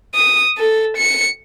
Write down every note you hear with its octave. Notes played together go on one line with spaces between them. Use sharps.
D#6
A4
C#7